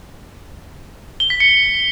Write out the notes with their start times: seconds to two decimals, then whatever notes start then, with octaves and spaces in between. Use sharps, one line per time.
1.20 G7
1.30 B6
1.40 C#7